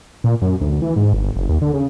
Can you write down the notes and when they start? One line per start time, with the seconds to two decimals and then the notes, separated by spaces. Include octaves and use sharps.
0.24 A#2
0.42 F#2
0.61 D2
0.82 E3
0.96 G#2
1.13 G1
1.36 F#1
1.49 D#2
1.62 D3
1.74 C#3